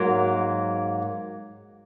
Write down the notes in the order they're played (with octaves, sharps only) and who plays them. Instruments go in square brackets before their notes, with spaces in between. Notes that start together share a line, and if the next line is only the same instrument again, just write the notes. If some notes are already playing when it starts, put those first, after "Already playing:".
Already playing: [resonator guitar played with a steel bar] G#2 F#3 A#3